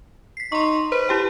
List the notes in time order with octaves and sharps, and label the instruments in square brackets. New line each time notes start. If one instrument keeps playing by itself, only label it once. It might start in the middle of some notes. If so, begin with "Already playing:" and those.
[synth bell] B6 C7
[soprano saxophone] D#4 [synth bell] C6 C#6
[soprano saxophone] B4 [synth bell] C5
[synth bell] E4 G4 G5